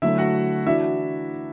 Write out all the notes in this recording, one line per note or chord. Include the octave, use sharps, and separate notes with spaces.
D3 F#3 A3 E4 E5
F#4 F#5
E3 D4 E4 F#4 E5